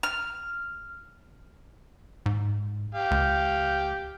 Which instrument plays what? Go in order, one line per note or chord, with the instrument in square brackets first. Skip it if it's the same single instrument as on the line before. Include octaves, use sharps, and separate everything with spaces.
[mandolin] F6
[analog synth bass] G#2
[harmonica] G4 F5
[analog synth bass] C#2